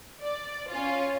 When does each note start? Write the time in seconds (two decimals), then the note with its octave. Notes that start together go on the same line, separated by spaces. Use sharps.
0.22 D5
0.68 C#4 F4